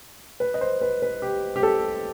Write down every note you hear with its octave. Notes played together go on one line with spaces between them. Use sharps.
B4
D#5
C5
B4
B4
G4
G4
A4